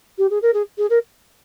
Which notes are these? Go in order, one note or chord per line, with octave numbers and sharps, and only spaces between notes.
G4
G#4
A#4
G#4
G#4
A#4